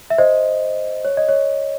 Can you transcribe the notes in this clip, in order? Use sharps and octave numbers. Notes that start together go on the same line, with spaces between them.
E5
C5 D#5
C#5
D#5
C#5